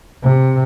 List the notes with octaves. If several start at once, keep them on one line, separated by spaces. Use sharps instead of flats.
C3